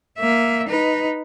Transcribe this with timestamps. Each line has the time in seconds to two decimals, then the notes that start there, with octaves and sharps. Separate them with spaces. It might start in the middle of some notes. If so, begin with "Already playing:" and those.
0.18 A#3 E5
0.68 D#4 B4